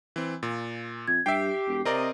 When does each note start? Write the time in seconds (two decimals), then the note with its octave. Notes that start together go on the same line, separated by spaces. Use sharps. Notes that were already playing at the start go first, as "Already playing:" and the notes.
0.16 E3 C4
0.43 A#2
1.08 F2 G#6
1.26 G2 G4 E5 G5 C7
1.68 E1
1.85 C3 C4 A#4 D5 D#5